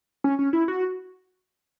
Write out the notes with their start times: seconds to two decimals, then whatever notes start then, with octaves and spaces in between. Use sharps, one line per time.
0.24 C#4
0.39 C#4
0.53 E4
0.68 F#4